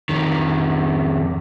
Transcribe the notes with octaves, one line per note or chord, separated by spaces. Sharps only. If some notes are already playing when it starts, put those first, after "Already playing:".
F2 D#3